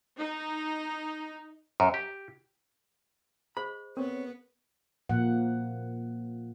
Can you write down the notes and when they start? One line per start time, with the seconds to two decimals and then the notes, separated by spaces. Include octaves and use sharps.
0.19 D#4
1.80 F#2
1.94 G4
3.57 G#4 C5 D#5 B5
3.97 B3 C4 A#4 C#5
5.09 A#2 F3 A#3 F#5